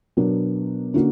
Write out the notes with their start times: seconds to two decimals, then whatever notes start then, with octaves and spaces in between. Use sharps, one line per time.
0.17 B2 F#3 B3 D4 A#4
0.94 D3 A#3 C#4 F#4